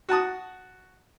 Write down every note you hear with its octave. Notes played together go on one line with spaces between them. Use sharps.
F#4 F#5 A5 D#6